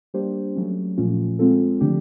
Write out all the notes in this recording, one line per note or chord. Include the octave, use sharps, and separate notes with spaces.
G3 A#3 D4 G4 C5
F#3 A3 C#4
A#2 F3 A3 C#4 F4
G#3 C4 F4 A4
D3 F3 A3 D4 G4